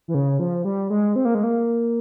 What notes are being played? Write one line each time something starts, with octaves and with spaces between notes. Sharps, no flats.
E3
C#3
F3
G3
G#3
C4
A#3
G#3
A#3